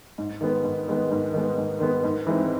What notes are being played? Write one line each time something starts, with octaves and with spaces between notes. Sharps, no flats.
G#2
D#3 G#3 B3
G#2
D#3 G#3 B3
G#2
D#3 G#3 B3
G#2
D#3 G#3 B3
G#2
E3 G#3 C4 D#4